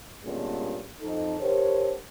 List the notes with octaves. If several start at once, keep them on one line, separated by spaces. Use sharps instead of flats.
G2 A#2 D3 G#3 B3 C#4
F2 D#4 A4
D3 G4 A#4 C5 C#5